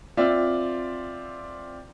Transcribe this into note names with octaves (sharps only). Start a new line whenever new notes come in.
C4 F4 D5 E5